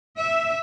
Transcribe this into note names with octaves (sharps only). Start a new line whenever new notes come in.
E5